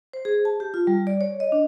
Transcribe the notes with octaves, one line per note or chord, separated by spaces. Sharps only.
C5
G#4
A5
G4
F4
G3
D5
C#5
D#5
D4